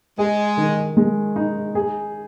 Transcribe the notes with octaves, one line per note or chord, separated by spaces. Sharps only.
G#3 G#4
D#3
G#3
D#4
G#4